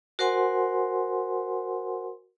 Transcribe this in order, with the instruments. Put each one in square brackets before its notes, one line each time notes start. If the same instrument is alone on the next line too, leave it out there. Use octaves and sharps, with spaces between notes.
[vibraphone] F#4 A#4 C5 F#5 G#5 C6